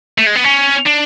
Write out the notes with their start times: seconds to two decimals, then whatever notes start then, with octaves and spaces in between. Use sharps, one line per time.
0.18 A3
0.27 G#3
0.35 B3
0.44 C#4
0.86 D4